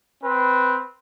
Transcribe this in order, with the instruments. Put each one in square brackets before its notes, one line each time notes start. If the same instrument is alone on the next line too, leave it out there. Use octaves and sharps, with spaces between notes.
[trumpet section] C4 B4